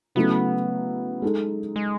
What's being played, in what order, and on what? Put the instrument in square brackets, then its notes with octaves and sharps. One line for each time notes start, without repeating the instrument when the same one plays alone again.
[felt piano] C#3 F#3 A3 E4 [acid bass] B3
[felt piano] G#3 D#4 A4
[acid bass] G#3